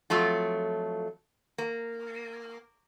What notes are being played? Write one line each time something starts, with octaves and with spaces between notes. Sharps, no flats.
F2 F#3 A3 F4
A#3